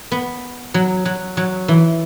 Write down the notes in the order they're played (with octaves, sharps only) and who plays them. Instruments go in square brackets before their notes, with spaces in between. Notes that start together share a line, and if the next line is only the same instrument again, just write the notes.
[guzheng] B3
F#3
F#3
F#3
E3